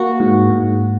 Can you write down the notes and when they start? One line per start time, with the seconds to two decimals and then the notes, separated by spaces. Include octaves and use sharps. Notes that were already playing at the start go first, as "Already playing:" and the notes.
Already playing: A#3 F#4
0.20 G#2
0.50 G#2